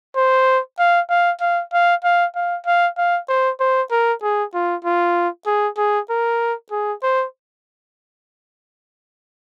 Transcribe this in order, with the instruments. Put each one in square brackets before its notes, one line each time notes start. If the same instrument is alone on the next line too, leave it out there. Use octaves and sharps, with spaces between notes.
[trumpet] C5
F5
F5
F5
F5
F5
F5
F5
F5
C5
C5
A#4
G#4
F4
F4
G#4
G#4
A#4
G#4
C5